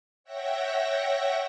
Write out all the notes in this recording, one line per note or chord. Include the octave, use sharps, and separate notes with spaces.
C#5 E5 F#5 G5 A#6